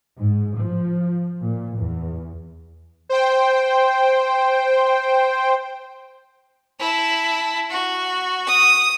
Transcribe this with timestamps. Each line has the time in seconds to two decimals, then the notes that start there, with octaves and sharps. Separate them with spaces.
0.19 G#2
0.58 F3
1.45 A#2
1.78 E2
3.09 C5 G5
6.80 E4 A5
7.70 F#4
8.47 D#6